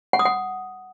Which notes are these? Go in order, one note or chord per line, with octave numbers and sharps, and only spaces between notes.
F#5
D#6
F#5